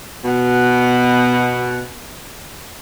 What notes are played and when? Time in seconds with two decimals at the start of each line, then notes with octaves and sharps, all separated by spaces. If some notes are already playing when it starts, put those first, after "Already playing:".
0.25 B2 F#5